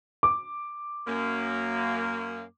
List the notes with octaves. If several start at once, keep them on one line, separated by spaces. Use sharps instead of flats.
D6
F#2 A#3